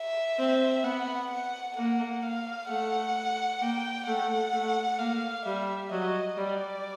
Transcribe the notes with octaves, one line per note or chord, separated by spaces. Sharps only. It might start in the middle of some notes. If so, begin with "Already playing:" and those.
Already playing: E5
C4
B3 F#5
F#5
A#3 F#5
F5
A3 F#5
A#3 G5
A3 F#5
A3
A#3 F5
G3 E5
F#3 D#5
G3 D5